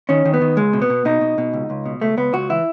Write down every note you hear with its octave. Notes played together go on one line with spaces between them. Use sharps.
D#3 C#4
D#3
B3
D#3
C#2 G#3
B2
B3
B2
B2 D#4
B2
B2
C#2
C#2
B2
C#2 A3
C#2 B3
C#2 F#4
E3 E4